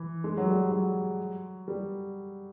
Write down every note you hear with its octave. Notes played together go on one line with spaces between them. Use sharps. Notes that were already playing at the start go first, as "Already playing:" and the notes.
Already playing: E3
G#3
F#3
G3
F#3
G3